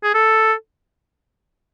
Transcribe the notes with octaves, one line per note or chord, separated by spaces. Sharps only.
G#4
A4